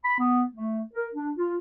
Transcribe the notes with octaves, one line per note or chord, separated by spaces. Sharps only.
B5
B3
A3
A#4
D4
F4